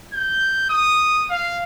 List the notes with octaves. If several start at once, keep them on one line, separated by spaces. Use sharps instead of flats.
G6
D#6
F5